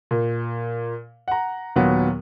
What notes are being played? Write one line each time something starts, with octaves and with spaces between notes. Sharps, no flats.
A#2
F#5 A#5
D#2 A#2 F#3 B3